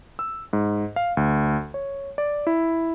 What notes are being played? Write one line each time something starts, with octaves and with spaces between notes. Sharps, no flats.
E6
G#2
F5
D2
C#5
D5
E4